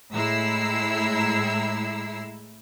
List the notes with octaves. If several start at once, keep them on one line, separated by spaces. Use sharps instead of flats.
A2 G#3 E4 A#5 E6 C7